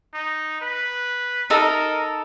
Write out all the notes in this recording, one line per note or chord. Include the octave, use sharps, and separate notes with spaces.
D#4
B4
D#4 A4 A#4